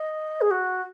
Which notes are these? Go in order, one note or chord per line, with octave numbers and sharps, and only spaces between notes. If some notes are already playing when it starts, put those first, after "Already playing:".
Already playing: D#5
G#4
F#4